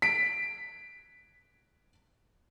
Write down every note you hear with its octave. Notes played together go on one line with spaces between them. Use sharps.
B6 D7